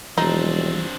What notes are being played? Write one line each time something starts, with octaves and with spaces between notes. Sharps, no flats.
E1 E3 F3 G3 C4 D4 D#4